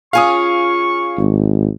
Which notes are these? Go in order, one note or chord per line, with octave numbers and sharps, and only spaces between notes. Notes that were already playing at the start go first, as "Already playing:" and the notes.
C#4 F4 G#4 F5 G#5 C#6 D#6
G#1